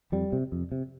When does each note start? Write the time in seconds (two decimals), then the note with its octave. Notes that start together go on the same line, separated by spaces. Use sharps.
0.12 F2 G3
0.33 C3
0.52 F2
0.72 C3